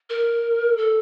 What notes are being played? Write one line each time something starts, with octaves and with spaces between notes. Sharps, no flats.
A#4
A4